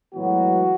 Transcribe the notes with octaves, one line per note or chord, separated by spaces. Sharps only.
A2 E3 F#3 G#3 B3 F#4